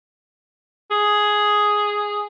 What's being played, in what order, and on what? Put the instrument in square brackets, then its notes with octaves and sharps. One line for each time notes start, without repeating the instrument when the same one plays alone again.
[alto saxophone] G#4